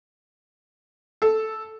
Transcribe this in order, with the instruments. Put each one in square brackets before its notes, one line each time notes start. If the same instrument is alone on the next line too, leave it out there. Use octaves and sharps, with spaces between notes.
[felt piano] A4